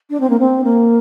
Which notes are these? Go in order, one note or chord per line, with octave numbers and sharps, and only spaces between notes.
D4
C4
A#3
C4
A#3